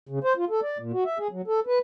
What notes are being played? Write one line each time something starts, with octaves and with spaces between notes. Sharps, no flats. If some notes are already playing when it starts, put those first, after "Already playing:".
C#3
C5
F4
A4
D5
A#2
F#4
E5
G#4
F#3
A4
B4